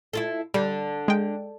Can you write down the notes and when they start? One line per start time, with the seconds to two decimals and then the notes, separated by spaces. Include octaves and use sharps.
0.13 E4 F4 A4
0.54 D3 G3
1.08 G#3 G5